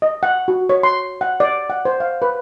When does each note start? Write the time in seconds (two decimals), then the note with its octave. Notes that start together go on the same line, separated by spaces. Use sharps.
0.02 D#5
0.23 F#5
0.48 F#4
0.70 C#5
0.83 C6
1.21 F#5
1.40 D5
1.70 F#5
1.85 C5
2.00 F5
2.22 B4